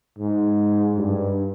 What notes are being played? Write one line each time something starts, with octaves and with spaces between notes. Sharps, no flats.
G#2
G2